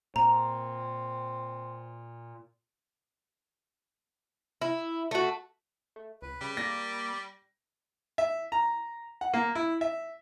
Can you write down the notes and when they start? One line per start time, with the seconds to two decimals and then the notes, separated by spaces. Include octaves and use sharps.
0.16 A#2 C4 A#5
4.62 E4
5.11 A3 F#4
5.96 A3
6.22 C#2 B4
6.41 C#3 G3
6.57 A#3 D5 A#6
8.18 E5
8.52 A#5
9.21 F#5
9.34 A#3
9.55 E4
9.81 E5